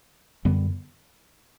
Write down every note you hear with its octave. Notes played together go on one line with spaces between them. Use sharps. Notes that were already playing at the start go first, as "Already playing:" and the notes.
F#2 D3 G3 B3